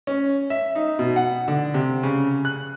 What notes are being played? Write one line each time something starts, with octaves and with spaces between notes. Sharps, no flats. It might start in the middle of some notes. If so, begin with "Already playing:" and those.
C#4
E5
D#4
B2
F#5
D3
C3
C#3
F#6